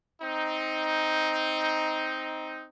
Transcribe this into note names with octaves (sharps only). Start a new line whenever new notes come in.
C4 D#4